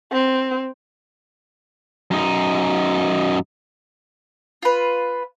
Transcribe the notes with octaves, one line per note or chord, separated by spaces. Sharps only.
C4
F#2 D#4
F4 B4